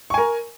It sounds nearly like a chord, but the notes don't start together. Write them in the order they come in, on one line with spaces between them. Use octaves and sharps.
C#6 G#5 A#4